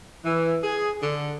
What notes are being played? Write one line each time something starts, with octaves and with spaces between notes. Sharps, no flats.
E3
G#4
D3